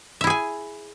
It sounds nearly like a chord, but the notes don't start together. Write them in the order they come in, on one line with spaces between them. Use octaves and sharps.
E5 E4 G#4 G#5